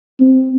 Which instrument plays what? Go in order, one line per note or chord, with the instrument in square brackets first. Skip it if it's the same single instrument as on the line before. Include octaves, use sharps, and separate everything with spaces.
[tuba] C4